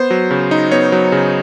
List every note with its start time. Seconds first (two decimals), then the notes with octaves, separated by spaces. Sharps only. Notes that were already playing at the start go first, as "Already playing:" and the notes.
Already playing: B3 C5
0.10 F#3
0.31 C#3
0.51 D#4
0.71 B3 C#5
0.92 F#3
1.12 C#3